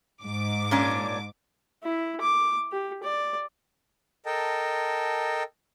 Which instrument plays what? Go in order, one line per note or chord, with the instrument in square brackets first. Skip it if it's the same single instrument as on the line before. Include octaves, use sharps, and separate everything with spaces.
[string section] G#2 D6
[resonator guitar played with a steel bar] A#2 C#4 D4
[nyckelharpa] E4
D6
G4
D5
[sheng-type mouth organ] A4 A#4 D#5 G5 A5